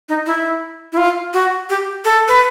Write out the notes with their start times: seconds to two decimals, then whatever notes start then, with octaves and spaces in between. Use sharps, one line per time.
0.09 D#4
0.26 E4
0.92 E4
0.97 F4
1.33 F#4
1.69 G4
2.05 A4
2.28 B4